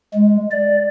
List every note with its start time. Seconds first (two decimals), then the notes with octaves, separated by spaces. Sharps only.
0.14 G#3
0.51 D5